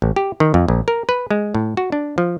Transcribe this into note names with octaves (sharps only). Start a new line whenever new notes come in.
A1
G4
D#3
F2
A#1
A#4
B4
G#3
A2
F#4
D4
F3